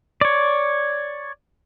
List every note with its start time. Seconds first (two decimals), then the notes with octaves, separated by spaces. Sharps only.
0.21 C#5 D5